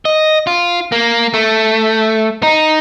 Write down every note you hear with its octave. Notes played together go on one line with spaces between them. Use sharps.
D#5
F4
A#3
A3
D#4